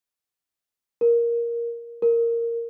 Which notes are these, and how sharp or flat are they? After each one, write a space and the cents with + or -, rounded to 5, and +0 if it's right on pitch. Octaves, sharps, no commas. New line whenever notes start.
A#4 +10
A#4 -5